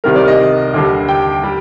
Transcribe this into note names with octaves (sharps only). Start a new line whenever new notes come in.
C2 C3 D#3 G3 A#4
D5
D#5
D#2 D3 G3
G5
G3